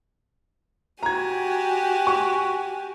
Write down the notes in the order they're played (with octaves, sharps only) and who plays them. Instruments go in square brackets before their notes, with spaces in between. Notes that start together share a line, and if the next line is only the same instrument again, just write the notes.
[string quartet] F#4 G4 G#5 [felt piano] A#5 G#6
[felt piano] C#6